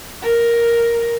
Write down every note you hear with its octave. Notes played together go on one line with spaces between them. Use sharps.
A#4